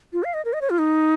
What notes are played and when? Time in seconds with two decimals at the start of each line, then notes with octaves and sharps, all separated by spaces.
0.13 F4
0.24 F5
0.34 D#5
0.45 A#4
0.53 D#5
0.62 C#5
0.70 F4
0.79 D#4